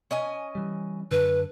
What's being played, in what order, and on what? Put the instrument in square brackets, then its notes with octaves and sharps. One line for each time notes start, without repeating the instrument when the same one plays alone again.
[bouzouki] C#4 D#5 G#5
[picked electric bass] E3 G3
[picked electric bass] F#2 D3 [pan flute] B4